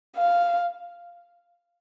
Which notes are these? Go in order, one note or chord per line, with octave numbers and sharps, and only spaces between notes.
F5